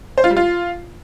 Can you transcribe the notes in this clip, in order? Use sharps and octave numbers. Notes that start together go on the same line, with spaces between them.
C5
F4
G3
F4